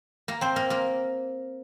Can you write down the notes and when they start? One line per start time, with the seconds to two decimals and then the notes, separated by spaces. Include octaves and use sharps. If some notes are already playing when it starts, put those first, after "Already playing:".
0.28 A#3 A#4
0.41 C4 C5
0.56 A#3 A#4
0.70 A#3 A#4